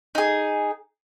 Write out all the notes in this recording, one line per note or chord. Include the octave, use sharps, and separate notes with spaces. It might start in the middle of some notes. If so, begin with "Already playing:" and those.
D#4 G#4